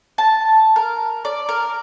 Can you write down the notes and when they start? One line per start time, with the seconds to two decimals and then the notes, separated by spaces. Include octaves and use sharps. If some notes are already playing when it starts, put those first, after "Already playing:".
0.18 A5
0.76 A#4
1.25 D5
1.49 A#4